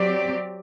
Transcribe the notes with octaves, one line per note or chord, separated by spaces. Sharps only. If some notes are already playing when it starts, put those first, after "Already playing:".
Already playing: F#3 C4 G4 D5